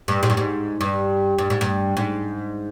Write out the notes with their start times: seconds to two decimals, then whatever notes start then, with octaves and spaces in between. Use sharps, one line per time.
0.08 G2
0.23 G#2
0.30 G2
0.37 G#2
0.81 G2
1.38 G2
1.50 G#2
1.61 G2
1.97 G#2